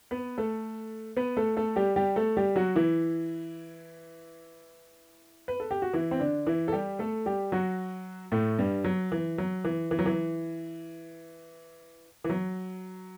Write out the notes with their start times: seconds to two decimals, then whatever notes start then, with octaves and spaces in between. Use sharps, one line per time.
0.11 B3 B4
0.38 A3 A4
1.17 B3 B4
1.37 A3 A4
1.57 A3 A4
1.76 G3 G4
1.96 G3 G4
2.16 A3 A4
2.37 G3 G4
2.56 F#3 F#4
2.76 E3 E4
5.48 B4
5.60 A4
5.71 G4
5.82 F#4
5.93 E3 E4
6.11 C4
6.20 D3 D4
6.46 E3 E4
6.68 A4
6.72 G3 G4
6.99 A3 A4
7.26 G3 G4
7.52 F#3 F#4
8.32 A2 A3
8.59 G2 G3
8.84 F#3
9.12 E3
9.38 F#3
9.64 E3
9.91 E3
9.99 F#3
10.06 E3
12.24 E3
12.30 F#3